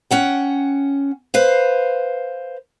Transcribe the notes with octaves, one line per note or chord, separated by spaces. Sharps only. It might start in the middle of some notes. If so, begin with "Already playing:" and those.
C#4 F#5 G5
B4 C5 F5